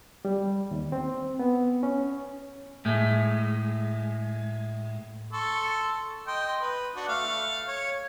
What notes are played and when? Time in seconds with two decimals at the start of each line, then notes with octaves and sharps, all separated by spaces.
0.25 G3
0.71 D#2
0.92 C4
1.39 B3
1.83 C#4
2.85 A2 G#3 A3
5.33 A4 C6 C#6
6.27 D#5 G5 C6
6.61 B4
6.96 D4 F#4
7.09 A3 F5 C#6
7.68 C#5